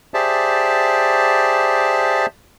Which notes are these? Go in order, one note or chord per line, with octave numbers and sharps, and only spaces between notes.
G4 G#4 C5 D5 E5 A5